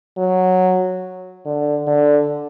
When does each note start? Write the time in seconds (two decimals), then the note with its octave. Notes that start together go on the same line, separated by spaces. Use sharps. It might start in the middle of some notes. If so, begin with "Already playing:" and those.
0.17 F#3
1.45 D3
1.87 D3